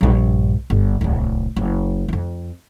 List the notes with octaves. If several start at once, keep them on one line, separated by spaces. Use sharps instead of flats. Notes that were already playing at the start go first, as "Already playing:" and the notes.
A#1 G2
G1
D1 C2
F#1
F2 F4